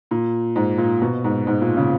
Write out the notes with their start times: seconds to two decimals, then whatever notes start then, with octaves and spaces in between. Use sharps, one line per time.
0.11 A#2
0.56 G#2
0.78 A#2
1.02 B2
1.24 G#2
1.47 G#2
1.61 A#2
1.77 C#3